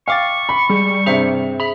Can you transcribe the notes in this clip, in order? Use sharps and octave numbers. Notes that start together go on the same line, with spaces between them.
F5 G5 C#6 D6 A6
B5
G3 G#3
G2 C3 G#4 C5 E5
G#4 E5 B5